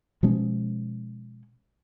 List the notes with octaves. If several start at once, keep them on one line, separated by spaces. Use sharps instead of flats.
B2 F3 G#3 C#4